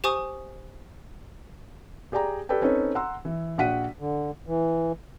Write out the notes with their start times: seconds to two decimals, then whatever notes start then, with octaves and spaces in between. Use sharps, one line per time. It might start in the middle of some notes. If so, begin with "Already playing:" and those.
0.04 G4 C5 G#5 C#6 D#6
2.12 G4 G#4 D5 G5 A#5
2.49 G4 A4 B4 D5 G5
2.61 C4 C#4 D#4 A4 B4 C#5
2.95 F#5 A#5 C6 E6
3.25 E3
3.58 A#1 F#4 F#5 B6 D#7
3.99 D3
4.47 E3